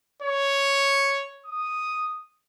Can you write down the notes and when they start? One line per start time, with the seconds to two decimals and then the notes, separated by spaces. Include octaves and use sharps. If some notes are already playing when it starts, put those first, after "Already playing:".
0.22 C#5
1.46 D#6